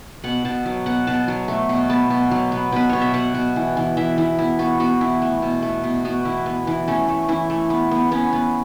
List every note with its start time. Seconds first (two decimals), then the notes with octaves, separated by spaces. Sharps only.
0.24 B2 F#5
0.45 B2 A5
0.66 F#3
0.86 B2 F#5
1.07 B2 A5
1.28 F#3
1.48 A3
1.69 B2
1.89 B3 A5
2.10 B2
2.31 F#3
2.52 B3
2.72 B2 B4
2.89 B2 C#5
3.01 E5
3.14 B2 F#5
3.34 B2
3.56 E3
3.77 E3
3.97 E3 E5
4.18 E3
4.39 B3 E4
4.59 B3 F#4
4.80 B3 F#4
5.01 E3 E4
5.22 A3
5.42 B2
5.62 A3
5.84 B2
6.05 B3 F#4
6.25 E3 E4
6.46 B3
6.67 E3
6.88 A3 C#4
7.08 A3
7.28 E3 E4
7.50 A3
7.70 B3
7.91 B3
8.11 B3 C#4
8.33 B3